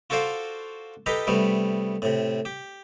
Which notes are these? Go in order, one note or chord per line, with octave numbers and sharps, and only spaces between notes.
F4 F#4 A4 C5 D5 F5
D#4 G4 A4 B4 A#5
C3 G3 A3 B3
A2 C3
G4